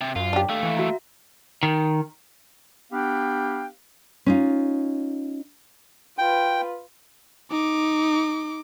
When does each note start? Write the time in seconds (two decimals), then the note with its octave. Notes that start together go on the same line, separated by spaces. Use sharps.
0.01 C3
0.16 F#2 F4
0.33 D4 G4
0.49 D#2 A3 F5
0.63 E3
0.77 F#4 E5 A#5
1.63 D#3
2.92 B3 D4 G4 F5 G5
4.26 C#4 D#4 F4
6.18 F4 B4 G5
7.51 D#4 D6